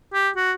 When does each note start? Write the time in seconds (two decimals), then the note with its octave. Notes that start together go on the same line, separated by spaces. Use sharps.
0.14 G4
0.36 F#4